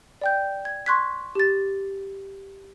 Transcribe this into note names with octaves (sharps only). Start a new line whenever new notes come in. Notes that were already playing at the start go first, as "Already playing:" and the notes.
D5 G5 G6
G#6
C6 C#6 F#6 G#6 B6
G4 A6